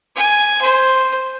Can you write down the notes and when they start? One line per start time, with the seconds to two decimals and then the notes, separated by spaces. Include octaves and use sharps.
0.16 G#5
0.61 C5